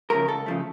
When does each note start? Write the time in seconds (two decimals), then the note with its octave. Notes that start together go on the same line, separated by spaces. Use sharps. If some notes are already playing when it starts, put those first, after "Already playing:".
0.10 C#3 F3 A3 A#4
0.28 C#2 A4
0.46 C#3 F3 A3